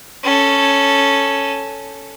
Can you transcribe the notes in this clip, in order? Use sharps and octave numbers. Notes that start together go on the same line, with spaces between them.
C#4 A4